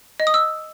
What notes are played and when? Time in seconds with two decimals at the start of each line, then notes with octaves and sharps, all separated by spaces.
0.20 D#5
0.27 D#6
0.34 E6